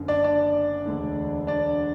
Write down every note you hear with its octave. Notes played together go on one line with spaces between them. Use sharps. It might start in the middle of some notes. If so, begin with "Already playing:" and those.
Already playing: F#1 F#2 D3
D4 D5
D4 D5
E1 D2 D3
D4 D5